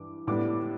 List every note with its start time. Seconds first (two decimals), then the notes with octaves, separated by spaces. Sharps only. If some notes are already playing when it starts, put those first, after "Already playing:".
Already playing: G2 E3 D6
0.27 A2 G3 B3 D4 D6